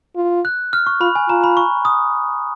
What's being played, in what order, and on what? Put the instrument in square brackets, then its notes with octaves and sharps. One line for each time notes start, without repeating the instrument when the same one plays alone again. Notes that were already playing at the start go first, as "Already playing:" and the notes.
[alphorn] F4
[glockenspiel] F#6
F6
C#6
[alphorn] F4 [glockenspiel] B5
[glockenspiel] G#5
[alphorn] F4 [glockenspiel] A#5
[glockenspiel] B5
C#6
D#6